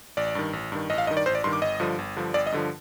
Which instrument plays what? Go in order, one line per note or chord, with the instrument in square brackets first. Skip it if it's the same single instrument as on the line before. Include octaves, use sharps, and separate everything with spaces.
[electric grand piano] A1 D5
G2 D#3
A1
G2 D#3
A1 D#5
F5
G2 D#3 D#5
D5
A1 C5
D5
G2 C6
D#3
D6
G1 D#5
G2 D3 F3
G1
G2 D3 F3
G1 D5
D#5
G2 D3 F3